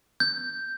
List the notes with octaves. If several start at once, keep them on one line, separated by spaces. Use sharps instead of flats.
G6